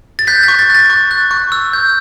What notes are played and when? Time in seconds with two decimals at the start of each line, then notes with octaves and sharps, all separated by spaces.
0.19 A6
0.27 F#6 G6 B6
0.43 A6
0.48 C#6
0.59 A6
0.70 F#6 A6
0.90 C#6
1.11 F#6
1.31 C#6
1.52 E6
1.73 G6